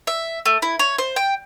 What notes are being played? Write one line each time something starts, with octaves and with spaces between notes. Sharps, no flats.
E5
A3
E4
C#5
C5
G5